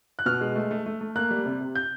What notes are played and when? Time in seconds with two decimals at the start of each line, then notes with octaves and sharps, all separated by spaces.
0.19 F#6
0.26 B2 F6
0.41 G#3
0.56 A3
0.71 A3
0.86 A3
1.01 A3
1.16 A#3 F#6
1.31 G3
1.45 C3
1.61 C3
1.75 G6